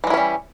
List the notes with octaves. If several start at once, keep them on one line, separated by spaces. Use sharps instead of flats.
E3 G3 G#3 C#4 E4